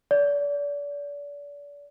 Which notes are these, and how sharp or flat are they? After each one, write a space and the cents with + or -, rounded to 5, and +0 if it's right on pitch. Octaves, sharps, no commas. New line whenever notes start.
D5 -35